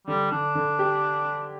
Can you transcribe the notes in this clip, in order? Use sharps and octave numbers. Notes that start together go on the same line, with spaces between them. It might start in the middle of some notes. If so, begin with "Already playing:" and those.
D3 G3
D3 D4
D3
G4